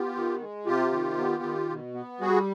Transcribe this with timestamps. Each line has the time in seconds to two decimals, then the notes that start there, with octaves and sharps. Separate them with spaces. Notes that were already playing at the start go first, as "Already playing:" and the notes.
Already playing: B3 F4 G4
0.15 D#3
0.41 G#3
0.66 C3 F4 G4
0.92 D#3
1.18 B3
1.43 D#3
1.69 B2
1.94 B3
2.20 G3 F#4 G#4